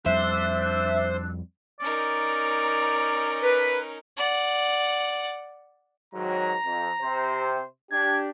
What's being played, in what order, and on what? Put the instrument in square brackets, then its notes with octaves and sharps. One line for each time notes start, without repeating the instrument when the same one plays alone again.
[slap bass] F2 G3 [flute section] D4 E6 F#6 [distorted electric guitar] C5 [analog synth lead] E5
[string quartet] C#4 D#4 A#4 [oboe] D5
[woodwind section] B4
[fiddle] D5 F#5
[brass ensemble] G#2 D#3 F#3 [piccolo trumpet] A#5
[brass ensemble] F2
C3 C5
[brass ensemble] D4 G4 [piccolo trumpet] G#6